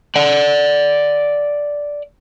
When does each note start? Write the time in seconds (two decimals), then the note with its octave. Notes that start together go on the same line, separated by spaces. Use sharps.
0.16 D5 F#5